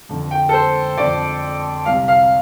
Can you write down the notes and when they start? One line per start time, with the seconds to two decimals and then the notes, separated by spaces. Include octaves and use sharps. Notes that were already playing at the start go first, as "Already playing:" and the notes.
0.09 F2 D3
0.31 G5
0.49 A4
0.53 C5
0.98 F2 D3 D5
1.86 C2 F5
1.89 C3
2.08 F5